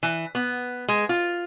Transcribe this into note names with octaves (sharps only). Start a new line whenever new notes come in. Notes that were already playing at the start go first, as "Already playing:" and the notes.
E3
B3
G#3
F4